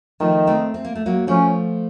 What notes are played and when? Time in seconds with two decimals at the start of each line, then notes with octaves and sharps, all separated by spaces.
0.20 D#3 F3 A3
0.47 A3 C4
0.74 C4
0.85 A#3
0.95 A3
1.06 F#3 A#3
1.27 F3 A3 C#4